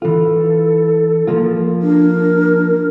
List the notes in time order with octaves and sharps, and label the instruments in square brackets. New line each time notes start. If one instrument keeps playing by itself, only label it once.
[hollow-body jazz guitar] E3 F4 [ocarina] A4
[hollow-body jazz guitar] F3 A#3 F4
[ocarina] D4 [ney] A#4